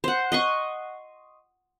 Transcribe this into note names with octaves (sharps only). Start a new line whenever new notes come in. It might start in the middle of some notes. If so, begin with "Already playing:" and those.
C5 F#5
D#5 C6 C#6